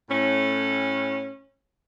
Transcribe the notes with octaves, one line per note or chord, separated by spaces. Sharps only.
A2 C#4